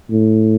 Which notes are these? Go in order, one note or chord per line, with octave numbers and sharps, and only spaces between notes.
A2